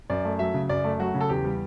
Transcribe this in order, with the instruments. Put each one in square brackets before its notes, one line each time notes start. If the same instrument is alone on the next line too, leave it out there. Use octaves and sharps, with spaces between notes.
[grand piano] F#2 D5
A3
F#3 E5
C#3
F#2 D5
A3
F#3 F#4
C#3
A4
E2 G4
G3